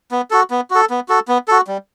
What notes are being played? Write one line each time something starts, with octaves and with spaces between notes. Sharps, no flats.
B3
F#4 A4
B3
F#4 A4
B3
F#4 A4
B3
F#4 A4
G3